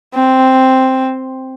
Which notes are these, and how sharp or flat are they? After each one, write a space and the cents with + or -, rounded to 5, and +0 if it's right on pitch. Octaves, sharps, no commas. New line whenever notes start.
C4 +0